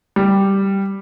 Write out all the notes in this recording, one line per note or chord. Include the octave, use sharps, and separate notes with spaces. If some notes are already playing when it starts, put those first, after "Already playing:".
G3